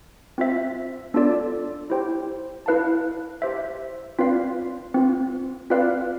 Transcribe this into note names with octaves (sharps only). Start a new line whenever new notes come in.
C4 F4 C5 E5
B3 D4 F4 A4 D5
E4 G4 C5 G5
E4 B4 F5 A5
G4 C5 E5
C4 F4 B4 D5 F5
C4 F4 B4
C4 F4 B4 D5 F5